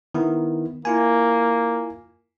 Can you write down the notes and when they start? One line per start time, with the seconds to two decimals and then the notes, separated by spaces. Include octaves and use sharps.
0.14 D#3 B3 E4
0.85 A#3 E4 F4 G#5